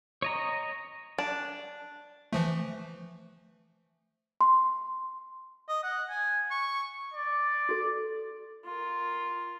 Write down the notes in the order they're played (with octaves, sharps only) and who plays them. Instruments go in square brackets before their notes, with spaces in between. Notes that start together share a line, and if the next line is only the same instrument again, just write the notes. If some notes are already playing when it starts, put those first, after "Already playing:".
[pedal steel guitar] C#5 D#5 A#5
[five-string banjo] D4
[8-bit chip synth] E3 F3 A3
[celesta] C6
[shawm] D#5
F#5
G#5
C#6
[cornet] D5
[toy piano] F#4 A4
[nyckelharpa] F4 A#4